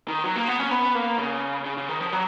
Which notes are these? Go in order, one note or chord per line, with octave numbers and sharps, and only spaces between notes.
D#3
F#3
A#3
B3
C#4
B3
A#3
C#3
C#3
C#3
D#3
F3
F#3